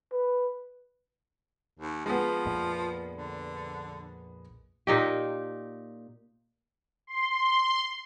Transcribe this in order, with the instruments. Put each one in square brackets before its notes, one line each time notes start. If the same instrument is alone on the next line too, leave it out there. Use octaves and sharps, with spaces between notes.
[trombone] B4
[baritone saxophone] D#2
[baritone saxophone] F3 [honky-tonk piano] G#3 B3
[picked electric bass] A#1 F2 A#2
[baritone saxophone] D3
[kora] A#2 D#4 G4
[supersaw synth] C6